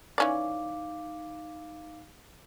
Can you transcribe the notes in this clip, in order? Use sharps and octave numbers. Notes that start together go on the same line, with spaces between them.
E3 C#4 D#4 D5 F5 D6